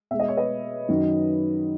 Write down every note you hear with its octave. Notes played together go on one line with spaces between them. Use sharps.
B2 G#3 E5
D#5
C#5
B4 D#5
F#2 D#3 F#3